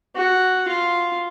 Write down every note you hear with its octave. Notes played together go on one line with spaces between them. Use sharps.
F#4
F4